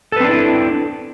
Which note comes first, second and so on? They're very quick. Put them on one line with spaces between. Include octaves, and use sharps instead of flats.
A4 B4 C4 D4 E4